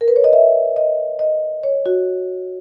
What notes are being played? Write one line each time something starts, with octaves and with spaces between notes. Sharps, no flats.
A#4
B4
C#5
D#5
E5
D#5
D#5
C#5
F#4